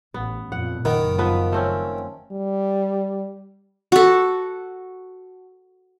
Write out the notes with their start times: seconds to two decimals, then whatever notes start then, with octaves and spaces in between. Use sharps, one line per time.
0.14 A1 B3
0.52 F2 A#2 F#5
0.85 F#1 D#3 B3
1.18 F3 B3 B4
1.52 A3 C4 C#4
2.32 G3
3.92 F#4 A4